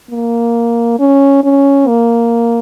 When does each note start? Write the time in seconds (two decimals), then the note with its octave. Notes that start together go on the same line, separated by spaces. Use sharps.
0.11 A#3
0.99 C#4
1.44 C#4
1.88 A#3